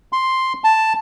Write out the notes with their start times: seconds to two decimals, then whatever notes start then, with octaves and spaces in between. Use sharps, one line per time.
0.13 C6
0.64 A5